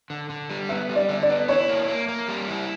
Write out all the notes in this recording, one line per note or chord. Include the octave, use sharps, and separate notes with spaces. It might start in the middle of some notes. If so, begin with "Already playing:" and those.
D3
D3
G3
B3 E5
G3
D5
D3
D5
B3
E4 C#5
A#3
A#3
A#3
G3
E4